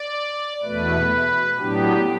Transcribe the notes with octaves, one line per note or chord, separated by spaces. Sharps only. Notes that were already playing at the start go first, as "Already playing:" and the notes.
Already playing: D5
E2 B2 A3 B4
A2 F#3 B3 D4 G4